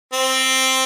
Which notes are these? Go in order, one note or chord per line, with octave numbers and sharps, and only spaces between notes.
C4